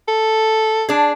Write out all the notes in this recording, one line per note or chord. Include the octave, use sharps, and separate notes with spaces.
A4
D4 G#4